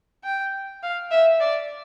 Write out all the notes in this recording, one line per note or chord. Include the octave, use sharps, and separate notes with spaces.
G5
F5
E5
D5